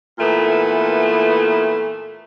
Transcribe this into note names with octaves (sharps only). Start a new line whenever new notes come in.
A#2 E3 A3 B3